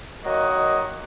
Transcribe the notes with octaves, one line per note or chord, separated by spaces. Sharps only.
D#3 F#3 A#3 F#4 D#5